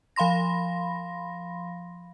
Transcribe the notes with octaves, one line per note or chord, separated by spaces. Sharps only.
F3 F5 B5 C6 A#6